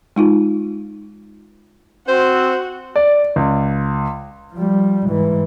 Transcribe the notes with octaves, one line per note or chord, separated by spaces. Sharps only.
G#3 D#4 F4
C4 F#4 C5
D5
C#2
F3 G3
G#2 E3